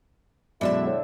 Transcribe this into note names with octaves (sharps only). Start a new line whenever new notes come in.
F#2 B2 D3 G#3 D4 E4 E5
A2